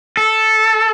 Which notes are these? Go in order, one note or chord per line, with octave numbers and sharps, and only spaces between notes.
A4